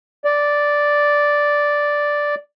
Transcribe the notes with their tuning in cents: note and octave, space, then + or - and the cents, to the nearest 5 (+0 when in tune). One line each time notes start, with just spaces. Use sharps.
D5 -5